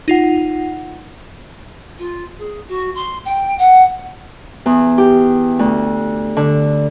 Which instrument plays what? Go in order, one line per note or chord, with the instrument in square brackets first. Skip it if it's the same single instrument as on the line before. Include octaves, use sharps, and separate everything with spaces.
[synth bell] D#4 F4 F#5
[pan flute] F4
G#4
F#4
C6
G5
F#5
[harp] E2
G4
D2
D3